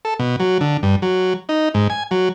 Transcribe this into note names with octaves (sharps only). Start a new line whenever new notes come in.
A4
B2
F#3
D3
G2
F#3
D#4
G#2
G#5
F#3